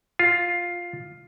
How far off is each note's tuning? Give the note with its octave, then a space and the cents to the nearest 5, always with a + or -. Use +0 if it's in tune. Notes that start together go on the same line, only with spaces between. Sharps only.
F4 +5